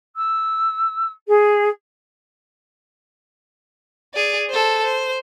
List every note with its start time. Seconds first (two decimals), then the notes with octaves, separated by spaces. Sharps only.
0.16 E6
1.27 G#4
4.14 G#4 D5
4.50 A4 C5
4.84 C5